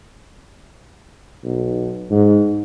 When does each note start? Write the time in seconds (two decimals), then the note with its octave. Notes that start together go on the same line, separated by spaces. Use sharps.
1.44 B1
2.11 G#2